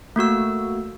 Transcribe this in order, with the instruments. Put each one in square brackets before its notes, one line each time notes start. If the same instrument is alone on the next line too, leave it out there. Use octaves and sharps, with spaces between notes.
[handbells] A3 A#3 F#4 E6